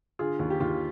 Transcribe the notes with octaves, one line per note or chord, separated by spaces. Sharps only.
D3 F4 G#4
D#2
G4
D#2 F4